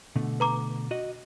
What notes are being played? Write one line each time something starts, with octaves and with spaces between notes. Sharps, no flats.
B2 D3 A3
B4 A#5 D6
F#4 D#5